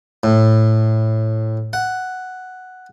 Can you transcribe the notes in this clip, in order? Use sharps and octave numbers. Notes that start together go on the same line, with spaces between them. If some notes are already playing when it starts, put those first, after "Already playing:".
A2
F#5